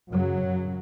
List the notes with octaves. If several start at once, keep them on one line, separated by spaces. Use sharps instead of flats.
F#2 C#3 F#3
F#2 C#3